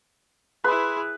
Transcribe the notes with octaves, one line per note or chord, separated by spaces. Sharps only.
E4 G#4 B4 B5 C6